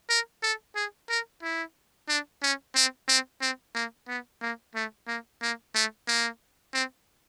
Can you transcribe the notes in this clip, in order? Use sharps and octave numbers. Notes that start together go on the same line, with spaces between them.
A#4
A4
G#4
A#4
E4
D4
C#4
C4
C4
C4
A#3
B3
A#3
A3
A#3
A#3
A3
A#3
C4